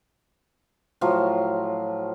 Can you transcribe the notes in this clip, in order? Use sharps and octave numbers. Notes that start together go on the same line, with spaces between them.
A2 F3 F#3 F4